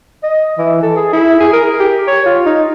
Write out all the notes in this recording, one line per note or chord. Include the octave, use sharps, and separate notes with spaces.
D#5
E3
A4
G#4
E4
G#4
A#4
G4
C#5
F4
D#4